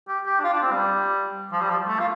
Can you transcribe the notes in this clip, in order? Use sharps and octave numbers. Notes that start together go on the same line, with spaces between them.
G4
G4
D4
F4
D4
C4
G3
F3
G3
F3
A3
F4